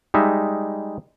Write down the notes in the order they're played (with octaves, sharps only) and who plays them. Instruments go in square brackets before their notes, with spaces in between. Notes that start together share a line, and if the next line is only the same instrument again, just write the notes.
[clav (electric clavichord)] G3 G#3 D#4 E5